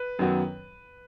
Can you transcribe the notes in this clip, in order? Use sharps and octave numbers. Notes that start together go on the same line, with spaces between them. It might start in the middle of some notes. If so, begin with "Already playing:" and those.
Already playing: B4
F#2 D#3 F#3 B3